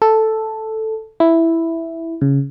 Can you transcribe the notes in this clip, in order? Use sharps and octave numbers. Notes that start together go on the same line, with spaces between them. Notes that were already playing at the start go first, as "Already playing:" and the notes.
A4
E4
C#3